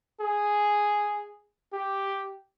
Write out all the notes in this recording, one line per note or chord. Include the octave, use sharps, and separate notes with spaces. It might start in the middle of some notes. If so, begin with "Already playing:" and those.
G#4
G4